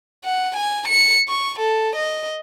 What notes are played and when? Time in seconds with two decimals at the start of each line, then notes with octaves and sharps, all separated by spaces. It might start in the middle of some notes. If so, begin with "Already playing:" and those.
0.25 F#5
0.56 G#5
0.88 C#7
1.28 C#6
1.59 A4
1.95 D#5